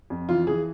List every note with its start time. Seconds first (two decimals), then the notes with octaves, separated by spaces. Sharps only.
0.10 F2
0.29 E3 F4
0.47 E3 G#4